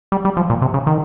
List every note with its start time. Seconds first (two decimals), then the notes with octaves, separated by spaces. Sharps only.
0.12 G3
0.25 G3
0.37 F3
0.50 A#2
0.62 C3
0.74 C#3
0.87 D#3